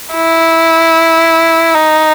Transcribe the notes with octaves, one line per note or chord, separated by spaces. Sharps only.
E4
D#4